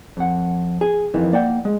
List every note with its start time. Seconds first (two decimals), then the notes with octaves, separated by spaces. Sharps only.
0.17 F2 F#5
0.81 G#4
1.14 F2 D#3 E3
1.32 A#3 D5 F#5 G5
1.65 G#3